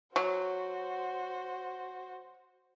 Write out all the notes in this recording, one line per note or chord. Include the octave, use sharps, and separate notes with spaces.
F#3 F#4 C5